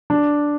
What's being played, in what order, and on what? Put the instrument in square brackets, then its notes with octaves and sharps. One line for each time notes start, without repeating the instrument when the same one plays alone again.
[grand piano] D4